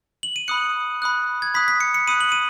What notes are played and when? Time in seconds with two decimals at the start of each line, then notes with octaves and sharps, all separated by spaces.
0.23 F#7
0.36 D#7
0.48 B5 D#6 F#6 C#7
1.02 B5 D#6 F#6
1.42 G#6
1.54 B5 D#6 F#6 B6
1.68 B6
1.80 C#7
1.94 C#7
2.07 B5 D#6 F#6 D#7
2.21 F#7
2.32 D#7